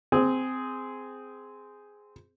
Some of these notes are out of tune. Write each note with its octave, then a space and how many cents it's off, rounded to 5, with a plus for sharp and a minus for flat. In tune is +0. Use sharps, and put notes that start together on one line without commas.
C4 -15 G#4 +0